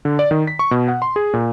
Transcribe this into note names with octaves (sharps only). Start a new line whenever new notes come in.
D3
D5
D#3
B6
C#6
B2
F#5
C6
G#4
A#2